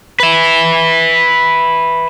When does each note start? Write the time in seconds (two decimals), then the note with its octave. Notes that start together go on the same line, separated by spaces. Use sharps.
0.20 B4 E5